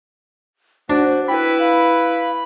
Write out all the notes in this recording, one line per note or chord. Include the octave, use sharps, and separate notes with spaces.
D4 F#4 C5
E4 B4 G5 B5
F5